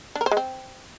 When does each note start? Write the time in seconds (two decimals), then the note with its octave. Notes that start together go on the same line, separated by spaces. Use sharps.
0.15 D4
0.21 A#4
0.26 C5
0.31 G#3
0.37 C4